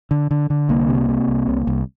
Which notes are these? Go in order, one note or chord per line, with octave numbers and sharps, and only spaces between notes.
D3
D3
D3
C2 A#3
C3
C3
C2
C2
C2